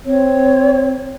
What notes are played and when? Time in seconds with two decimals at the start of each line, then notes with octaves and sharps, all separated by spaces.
0.05 C4 C#5